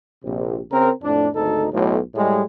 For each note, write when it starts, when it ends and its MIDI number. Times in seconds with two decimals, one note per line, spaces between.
0.24 0.60 34
0.24 0.60 48
0.71 0.90 49
0.71 0.90 60
0.71 0.90 70
1.02 1.27 41
1.02 1.27 45
1.02 1.27 62
1.34 1.66 32
1.34 1.66 38
1.34 1.66 63
1.34 1.66 69
1.72 1.98 35
1.72 1.98 45
2.15 2.42 45
2.15 2.42 55
2.15 2.42 56